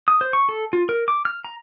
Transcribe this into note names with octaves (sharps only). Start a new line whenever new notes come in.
D#6
C5
C#6
A4
F4
A#4
D6
F6
A#5